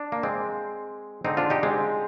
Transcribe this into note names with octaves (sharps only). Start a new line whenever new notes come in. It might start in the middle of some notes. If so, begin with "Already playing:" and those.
Already playing: D4
A#3
G#3 C4
D3 G#3 C4 D#4
D4 F4
D#4 G4
G#3 C4